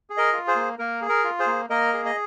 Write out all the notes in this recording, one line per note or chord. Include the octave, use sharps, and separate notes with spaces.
G#4
A#4 D#5
F4
G#4 C5
A#3
A#3 A#4
G#4
A#4
F4
G#4 C5
A#3
A#3 A#4 D#5
G#4
D#5